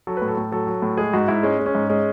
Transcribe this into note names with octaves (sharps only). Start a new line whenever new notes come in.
F#3 A4
A2 B4
A4
A2
F#3 A4
F#3
A2
G#3 G#4
G#2 F#4
G#2 E4
G#3 C#4
G#3
C#4
G#2
G#3 C#4